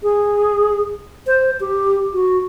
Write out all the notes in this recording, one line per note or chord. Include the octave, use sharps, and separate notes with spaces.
G#4
C5
G4
F#4